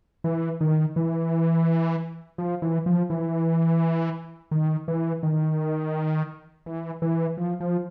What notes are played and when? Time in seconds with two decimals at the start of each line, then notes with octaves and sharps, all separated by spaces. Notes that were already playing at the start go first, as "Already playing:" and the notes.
0.24 E3
0.61 D#3
0.96 E3
2.38 F3
2.62 E3
2.86 F3
3.10 E3
4.51 D#3
4.88 E3
5.23 D#3
6.66 E3
7.02 E3
7.37 F3
7.60 F3